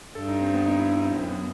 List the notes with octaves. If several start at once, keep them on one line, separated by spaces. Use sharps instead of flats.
G2 A4
D#4
C4
B3
D#4
E4
D#4
C4
F#2 C4
B3